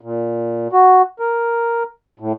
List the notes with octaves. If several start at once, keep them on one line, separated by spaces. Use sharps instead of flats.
A#2
F#4
A#4
A2